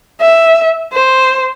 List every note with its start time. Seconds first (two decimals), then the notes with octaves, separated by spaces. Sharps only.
0.21 E5
0.93 C5